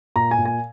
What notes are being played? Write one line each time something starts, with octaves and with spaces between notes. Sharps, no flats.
A#2 A#5
G#5
A#2
G#5